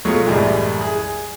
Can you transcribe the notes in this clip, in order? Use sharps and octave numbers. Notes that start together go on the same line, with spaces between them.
B2 F#3 G#3 A3 F4
C2 F#2 A2 E3 G3 G#3
G#4